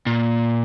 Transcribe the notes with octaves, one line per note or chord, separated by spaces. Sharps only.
A#2